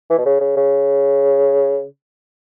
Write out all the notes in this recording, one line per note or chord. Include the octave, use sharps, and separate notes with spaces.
E3
B2
C#3
C#3
C#3